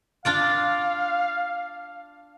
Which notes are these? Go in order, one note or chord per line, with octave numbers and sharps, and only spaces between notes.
D4 F4 D5 F5